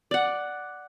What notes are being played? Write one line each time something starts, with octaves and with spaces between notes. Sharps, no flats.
D5 F#5